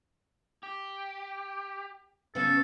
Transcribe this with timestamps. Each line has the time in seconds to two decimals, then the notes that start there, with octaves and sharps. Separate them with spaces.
0.63 G4
2.35 C#3 B3 C#4 A4